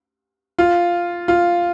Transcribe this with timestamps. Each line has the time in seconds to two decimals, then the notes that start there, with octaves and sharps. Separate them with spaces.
0.59 F4
1.28 F4